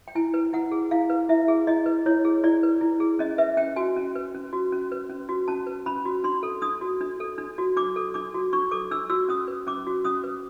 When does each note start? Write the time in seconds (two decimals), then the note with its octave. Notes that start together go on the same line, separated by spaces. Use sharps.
0.08 G5
0.15 E4 G#5
0.34 B4
0.53 E4 F#5
0.72 G#4
0.91 E4 F5
1.10 B4
1.29 E4 E5
1.48 G#4
1.67 E4 D#5
1.86 B4
2.06 E4 C#5
2.25 G#4
2.44 E4 D5
2.63 B4
2.81 E4
3.00 G#4
3.19 C#4 D#5
3.38 B4 E5
3.57 C#4 G5
3.76 F#4 G#5
3.96 C#4
4.15 B4
4.34 C#4
4.53 F#4
4.72 C#4
4.92 B4
5.10 C#4
5.29 F#4
5.48 C#4 A5
5.67 B4
5.86 C#4 B5
6.05 F#4
6.24 D4 C6
6.43 A4
6.62 D4 D#6
6.81 F#4
7.01 D4
7.20 A4
7.38 D4
7.58 F#4
7.77 D4 D6
7.96 A4
8.14 D4 D6
8.34 F#4
8.53 D4 C#6
8.71 A4 D6
8.91 D4 E6
9.10 F#4 E6
9.29 C#4 D#6
9.48 B4
9.67 C#4 D6
9.87 F#4
10.05 C#4 D#6
10.24 B4